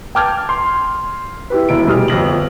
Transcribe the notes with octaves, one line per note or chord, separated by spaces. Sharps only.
G5 A5 D6 F6 G6 G#6
C6
E4 G4 B4
E1 E4 D7
F1 G3 G#4 D#6 F6
G1 F2 A#6 F#7